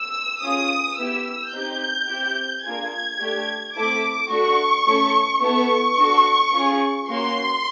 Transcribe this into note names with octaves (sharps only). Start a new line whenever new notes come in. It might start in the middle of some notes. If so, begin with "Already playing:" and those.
Already playing: E6
C#4 F4 G#4 D#6
B3 E4 G4 E6
C4 D#4 G4 G6
C4 E4 G4
A#3 D4 F4 G#4 G#6
A3 D4 G4
A3 C4 E4 A4 D6
A3 D4 F#4 C#6
A3 C#4 E4 A4
B3 E4 A4 C#6
D4 F#4 A4
C#4 F4 G#4
A#3 C#4 F#4 C6